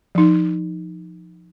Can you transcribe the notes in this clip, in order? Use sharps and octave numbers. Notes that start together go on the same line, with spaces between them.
F3 D#4